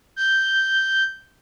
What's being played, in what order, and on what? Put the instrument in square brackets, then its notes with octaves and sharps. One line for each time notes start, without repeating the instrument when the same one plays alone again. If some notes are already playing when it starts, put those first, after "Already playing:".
[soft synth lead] G6